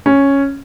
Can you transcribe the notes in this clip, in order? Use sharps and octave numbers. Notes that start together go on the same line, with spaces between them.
C#4